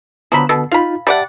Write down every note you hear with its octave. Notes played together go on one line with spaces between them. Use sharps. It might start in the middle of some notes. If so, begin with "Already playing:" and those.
D3 F3 F#3 B3 B5
B2 A4
D#4 F4 F5 B5
G3 D5 E5 F#5 G5 A5